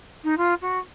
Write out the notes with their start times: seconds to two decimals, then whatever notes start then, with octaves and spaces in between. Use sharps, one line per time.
0.24 D#4
0.37 F4
0.62 F#4